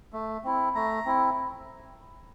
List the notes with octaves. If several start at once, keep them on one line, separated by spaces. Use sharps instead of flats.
A3
C4 E4
A3 A#5
C4 E4